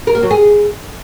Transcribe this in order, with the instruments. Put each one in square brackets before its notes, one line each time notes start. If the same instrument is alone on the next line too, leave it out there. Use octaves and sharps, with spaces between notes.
[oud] A#4
A#3
F#3
G#4